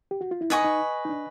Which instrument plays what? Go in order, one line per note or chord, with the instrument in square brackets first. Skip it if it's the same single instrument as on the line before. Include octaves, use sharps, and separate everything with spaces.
[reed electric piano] G4
F#4
F4
E4
[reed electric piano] D#4 [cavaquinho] B4 D#5 G#5 C#6
[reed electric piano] D#4
D#4
D4